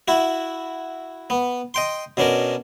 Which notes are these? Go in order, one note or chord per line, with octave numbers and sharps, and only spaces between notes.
E4 F#4
B3
D#5 G5 C6
B2 C#4 D4 A#4